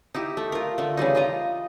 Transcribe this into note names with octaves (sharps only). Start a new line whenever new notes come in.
D#4 E4 G4
A3
F4 A#4
D3 A3
C#3 E3 G3 D#4
D#4 F4 D#5 A#5